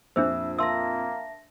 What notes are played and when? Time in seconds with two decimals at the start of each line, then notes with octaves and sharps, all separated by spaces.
0.16 F2 A#2 D4 G#4 C5 E5 E6
0.59 A#3 E5 A5 C6 E6 A#6